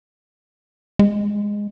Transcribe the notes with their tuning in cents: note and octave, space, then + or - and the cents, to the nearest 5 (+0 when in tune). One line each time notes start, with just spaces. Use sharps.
G#3 -10